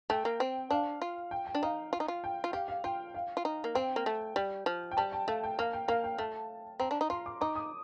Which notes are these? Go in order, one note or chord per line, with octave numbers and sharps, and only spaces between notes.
A3 G5
A#3
C4
D4 F5
F4
G5
G5
D4
D#4 F5
F4
D#4
F4
G5
F4
G4 F5
F5
F4 G5
F5
F4
D#4
A#3
C4 G5
A#3
A3
G3 G5
F3
G5
G3 A5
G5
A3 F5
G5
A#3 F5
G5
A#3 F5
G5
A3 A5
C4 A#5
D4
D#4
F4 C6
D6
D#4 D6
D#6